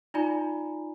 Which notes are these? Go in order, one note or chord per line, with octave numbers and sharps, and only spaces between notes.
D#4 F4 D5 G#5 A#5 B5